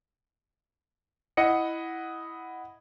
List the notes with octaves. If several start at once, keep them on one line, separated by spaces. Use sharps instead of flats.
E4 D#5 F#5 C#7